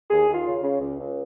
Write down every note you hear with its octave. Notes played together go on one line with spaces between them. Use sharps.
D#2 G#4
D#2
F4
C#3
C#3
C#2
C#2